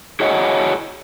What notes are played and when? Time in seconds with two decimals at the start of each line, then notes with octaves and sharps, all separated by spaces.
0.20 E4 F#4 G#4 C#5 D#5 F#5